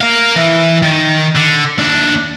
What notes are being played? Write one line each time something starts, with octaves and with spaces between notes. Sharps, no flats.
A#4 F5
E3
D#3
D3
D#2 D4